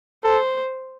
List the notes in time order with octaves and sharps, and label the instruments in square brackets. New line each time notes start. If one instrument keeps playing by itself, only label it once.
[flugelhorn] A4 [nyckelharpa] C5